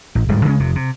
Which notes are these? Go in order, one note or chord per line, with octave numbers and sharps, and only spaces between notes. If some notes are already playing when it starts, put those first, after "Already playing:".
A1
D1 G#2 G3
C#3 G#3 C#4
F1 C3
C3